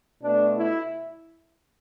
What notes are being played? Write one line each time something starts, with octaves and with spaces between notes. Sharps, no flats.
B2 A3 D4
E4